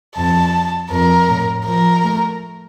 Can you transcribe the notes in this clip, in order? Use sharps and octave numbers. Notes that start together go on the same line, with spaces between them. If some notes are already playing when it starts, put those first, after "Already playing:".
F2 A5
F2 A#4
A2
F3 A#4
A3